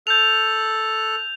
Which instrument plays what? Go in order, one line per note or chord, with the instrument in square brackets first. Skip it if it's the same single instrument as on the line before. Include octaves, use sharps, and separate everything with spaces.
[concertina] A4 F#6 [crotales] G6 F7